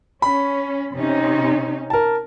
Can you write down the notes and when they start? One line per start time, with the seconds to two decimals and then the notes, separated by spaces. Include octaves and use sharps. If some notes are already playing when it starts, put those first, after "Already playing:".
0.22 C#4 B5
0.94 C3 C#4 D#4
1.90 A#4 A5